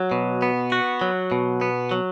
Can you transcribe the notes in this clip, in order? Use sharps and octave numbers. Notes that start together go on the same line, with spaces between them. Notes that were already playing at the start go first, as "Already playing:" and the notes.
Already playing: F#3
B2
B3
F#4
F#3
B2
B3
F#3